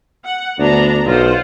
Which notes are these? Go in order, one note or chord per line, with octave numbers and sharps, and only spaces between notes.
F#5
D2 B3 D4 A#5
B1 F4 C5 F#5